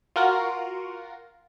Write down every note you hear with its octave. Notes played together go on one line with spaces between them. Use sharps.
F4 F#4 A#4 F#5